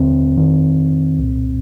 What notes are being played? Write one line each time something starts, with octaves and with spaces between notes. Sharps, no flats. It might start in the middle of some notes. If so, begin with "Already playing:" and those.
Already playing: D#2 D3 C4
F2 D#3
C2 A#2